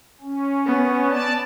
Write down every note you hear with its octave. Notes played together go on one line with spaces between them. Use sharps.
C#4
B3
D5 A5